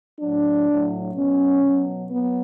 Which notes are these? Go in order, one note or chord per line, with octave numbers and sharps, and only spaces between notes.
A2 F#3 D4
A2 F#3
B2 F#3 C#4
B2 F#3
F#3 B3